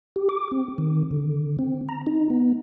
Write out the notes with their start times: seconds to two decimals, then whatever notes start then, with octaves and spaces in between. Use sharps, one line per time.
0.16 G4
0.29 D6
0.52 C4
0.78 D#3
1.11 D3
1.59 C4
1.89 A#5
2.07 D#4
2.30 B3